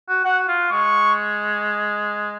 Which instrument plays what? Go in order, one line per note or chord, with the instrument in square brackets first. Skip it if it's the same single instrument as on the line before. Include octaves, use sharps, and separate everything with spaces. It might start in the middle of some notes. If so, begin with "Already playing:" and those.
[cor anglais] F#4
[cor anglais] F#4 [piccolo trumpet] F#5
[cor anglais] F4
[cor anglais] G#3 [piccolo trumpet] C#6